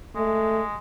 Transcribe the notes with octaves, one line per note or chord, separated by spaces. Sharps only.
G#3 A3